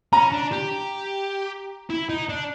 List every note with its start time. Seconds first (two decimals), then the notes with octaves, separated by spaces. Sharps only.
0.13 C#4 A#5
0.32 D4
0.52 G4
1.90 E4
2.09 D#4
2.29 D4